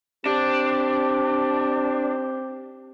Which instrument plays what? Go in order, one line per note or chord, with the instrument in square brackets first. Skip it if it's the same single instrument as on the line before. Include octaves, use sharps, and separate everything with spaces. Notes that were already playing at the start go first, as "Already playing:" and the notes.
[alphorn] C4 [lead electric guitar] D4 [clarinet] G4